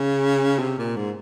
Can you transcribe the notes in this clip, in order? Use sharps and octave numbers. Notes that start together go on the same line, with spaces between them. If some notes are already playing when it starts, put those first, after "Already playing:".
Already playing: C#3
C3
A#2
G#2